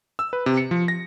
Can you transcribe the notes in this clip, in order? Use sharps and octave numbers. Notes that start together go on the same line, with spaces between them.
E6
B4
C3
C#7
F3
A#6